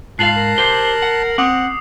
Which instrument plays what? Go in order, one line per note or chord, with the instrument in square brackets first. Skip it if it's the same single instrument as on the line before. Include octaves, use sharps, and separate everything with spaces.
[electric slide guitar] G#2 G#4 F5 [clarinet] F4 [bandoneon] A5 F#6 [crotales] C7 F#7
[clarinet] A#4
[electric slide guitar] G4 C5
F#5
[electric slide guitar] C4 [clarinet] F#5 [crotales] D6 D#6